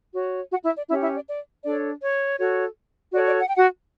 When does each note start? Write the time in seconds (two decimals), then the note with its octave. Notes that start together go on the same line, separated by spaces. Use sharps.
0.14 F#4 C#5
0.51 F#4 F#5
0.64 E4 E5
0.77 D5
0.89 C#4 E4 G4 C#5 E5
1.01 E4 E5
1.15 D5
1.27 D5
1.64 D4 A4 C#5 D5
2.02 C#5
2.39 F#4 A4 C#5
3.13 F#4 A4 C#5 D5
3.26 D5
3.39 F#5
3.47 G5
3.55 F#4 F#5